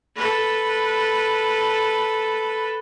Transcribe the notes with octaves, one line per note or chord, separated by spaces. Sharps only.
A4 B4